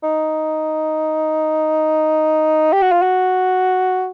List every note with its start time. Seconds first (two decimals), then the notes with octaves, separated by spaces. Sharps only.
0.04 D#4
2.73 G4
2.82 F#4
2.92 F4
3.02 F#4